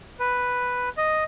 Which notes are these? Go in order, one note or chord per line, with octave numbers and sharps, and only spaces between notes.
B4
D#5